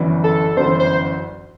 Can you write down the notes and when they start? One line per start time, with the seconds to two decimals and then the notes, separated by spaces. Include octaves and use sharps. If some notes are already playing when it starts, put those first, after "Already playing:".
Already playing: G1 F#2 E3
0.24 A4
0.57 G1 F#2 E3 C5
0.80 C5